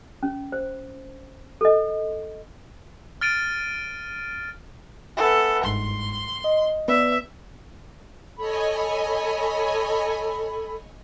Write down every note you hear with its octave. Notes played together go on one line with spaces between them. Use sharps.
C#4
C5
A4 D#5
F6 A6 D7 D#7
B3 A4 E5 G#5 E6
G1 G#2 C6
D#5
B3 B4 D5 E5
A4 C#5 D#5 G#5 B5